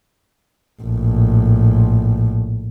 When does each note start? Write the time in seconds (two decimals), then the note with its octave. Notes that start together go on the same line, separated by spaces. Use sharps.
0.82 A#1 A2